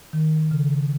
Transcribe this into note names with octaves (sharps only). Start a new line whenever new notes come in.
D#3
C#3